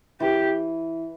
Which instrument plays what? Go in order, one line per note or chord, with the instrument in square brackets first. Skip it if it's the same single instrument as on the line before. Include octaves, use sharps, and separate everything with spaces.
[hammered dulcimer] E3 [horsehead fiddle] G4